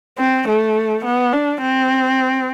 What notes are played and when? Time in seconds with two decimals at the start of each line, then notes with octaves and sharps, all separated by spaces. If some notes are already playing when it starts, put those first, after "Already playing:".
0.18 C4
0.48 A3
1.05 B3
1.33 D4
1.62 C4